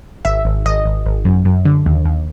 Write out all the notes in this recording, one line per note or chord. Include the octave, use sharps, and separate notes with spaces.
G#1 E5
G#1
G#1 D#5
G#1
G#1
F#2
F#2
D3
D#2
D#2